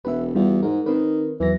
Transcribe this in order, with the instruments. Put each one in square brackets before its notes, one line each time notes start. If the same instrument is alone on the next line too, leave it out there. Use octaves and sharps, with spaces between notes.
[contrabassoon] E1 [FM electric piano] B4 E5
[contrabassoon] E2 [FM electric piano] G3 F4 F#4
[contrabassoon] G#2 [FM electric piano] A#4
[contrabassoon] D#3 [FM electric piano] C4 B4
[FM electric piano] E2 F#3 A#6 [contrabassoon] E3